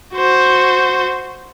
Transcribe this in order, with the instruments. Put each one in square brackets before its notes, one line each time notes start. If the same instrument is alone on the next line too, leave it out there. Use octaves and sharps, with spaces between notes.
[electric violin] F#4 C5